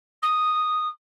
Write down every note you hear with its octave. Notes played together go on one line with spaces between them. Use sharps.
D#6